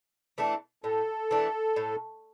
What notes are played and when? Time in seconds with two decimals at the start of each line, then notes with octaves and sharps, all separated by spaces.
0.38 E3 A3 D4
0.84 A2 A4
1.31 E3 A3 D4
1.76 A2